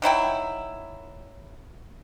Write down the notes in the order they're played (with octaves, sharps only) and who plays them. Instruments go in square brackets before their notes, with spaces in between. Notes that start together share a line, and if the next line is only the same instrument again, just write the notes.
[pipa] D#3 F#3 E4 G5